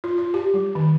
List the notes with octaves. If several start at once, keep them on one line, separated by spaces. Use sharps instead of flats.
F4
F4
G4
G3
D#3